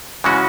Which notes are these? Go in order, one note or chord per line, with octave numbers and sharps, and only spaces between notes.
C#3 E3 G#3 C#4 F#4